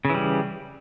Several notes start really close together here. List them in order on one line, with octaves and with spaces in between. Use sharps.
C#3 E3 G3